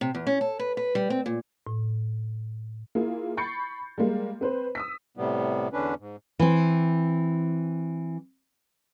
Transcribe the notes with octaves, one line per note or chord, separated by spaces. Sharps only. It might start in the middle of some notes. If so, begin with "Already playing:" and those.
C3
E2
C#4
A4
B4
B4
G3
C4
A#2
A2
A#3 E4 F4 G#4
B5 C#6 G6 A6 C7 C#7
G3 G#3 A#3
C4 B4 C5
D#6 E6 B6
A2 C3 G3 B3
E2 D3 C#4 D4 B4
G#2
E3 C4